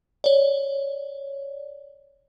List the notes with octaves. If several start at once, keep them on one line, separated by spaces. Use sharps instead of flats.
C#5 D5